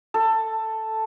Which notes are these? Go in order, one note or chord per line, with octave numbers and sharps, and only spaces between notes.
A4